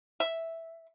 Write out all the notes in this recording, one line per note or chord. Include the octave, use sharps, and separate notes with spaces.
E5